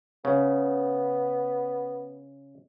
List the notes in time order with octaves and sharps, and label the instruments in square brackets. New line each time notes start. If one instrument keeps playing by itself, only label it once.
[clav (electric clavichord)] C#3 [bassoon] B3